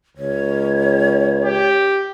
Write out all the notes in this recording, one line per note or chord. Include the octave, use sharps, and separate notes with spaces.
C#2 C#5
G4